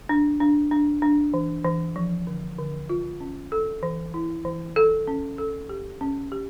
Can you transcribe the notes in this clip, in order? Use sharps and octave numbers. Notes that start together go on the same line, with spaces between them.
D4
D4
D4
D4
E3
E3
F3
D3
D3
F4
C#4
A4
E3
E4
E3
A4
C#4
A4
G4
C#4
G4